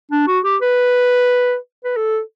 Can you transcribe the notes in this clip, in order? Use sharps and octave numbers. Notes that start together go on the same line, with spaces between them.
D4
F#4
G4
B4
B4
A4